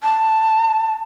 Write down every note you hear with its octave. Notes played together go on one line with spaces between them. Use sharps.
A5